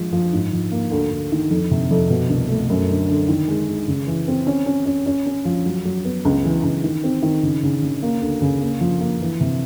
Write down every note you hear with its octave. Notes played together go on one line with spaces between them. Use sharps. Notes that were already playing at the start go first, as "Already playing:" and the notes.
Already playing: F3 G#3
F3
G#2
F3
A#3
D2
D2
D#3
F2
C3
F2
B2
C2
A3
F#2
D3
D3
D#3
G#3
G#3
C#3
E3
C4
C#4
C#4
C#4
C#4
C#4
F3
F#3
F#3
B3
C#2
E3
C#2
D#3
C4
D#3
C#3
C#3
C#3
A#3
D2
C#3
A#3
F3
A#3
E3
C3